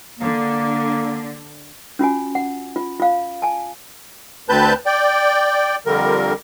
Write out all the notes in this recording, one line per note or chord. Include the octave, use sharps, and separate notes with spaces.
D3 A#3
C#4 F4 F#4 G#5
F#5
F4
F4 F5
G#5 A5
D2 C4 B4 A5 G6
D5 G5
F2 D3 G3 A#4